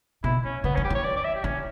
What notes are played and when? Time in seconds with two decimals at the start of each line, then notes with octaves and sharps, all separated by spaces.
0.24 B2 E4
0.44 C#4
0.64 C#3 B3
0.75 E3 C#4
0.84 G4
0.90 E3 C#5
1.04 D5
1.16 D5
1.24 E5
1.35 G4
1.44 E3 C#4